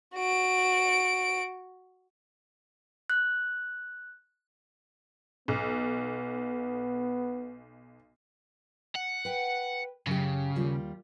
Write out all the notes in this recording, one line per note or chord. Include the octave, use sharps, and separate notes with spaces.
F#4 D7
F#6
B1 B3
F#5
B4 G5
F#2 C#3 G4
D#2 G3 F4